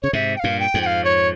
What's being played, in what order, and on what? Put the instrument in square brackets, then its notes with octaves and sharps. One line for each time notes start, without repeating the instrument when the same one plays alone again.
[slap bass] C#3 [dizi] C#5
[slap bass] G#2 C3 [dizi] E5
[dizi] G5
[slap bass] G2 A#2 [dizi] F5
[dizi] G5
[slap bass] F2 G#2
[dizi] G5
F5
C#5